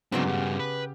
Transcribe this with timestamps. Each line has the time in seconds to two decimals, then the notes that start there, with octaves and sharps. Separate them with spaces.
0.12 G#2 C#3 F#3 B3 C4 D4 D6
0.26 G2 F#4 G4
0.59 B4